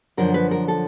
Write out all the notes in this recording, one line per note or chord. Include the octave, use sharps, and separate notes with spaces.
F#2 D3 F3 A#4
B4
A#4
A4